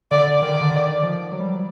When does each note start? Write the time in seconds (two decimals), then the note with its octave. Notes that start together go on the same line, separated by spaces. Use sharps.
0.11 D3 D5
0.42 D#3 D5
0.61 D3
0.71 D#3
1.03 F3
1.32 F#3
1.40 G3
1.47 F#3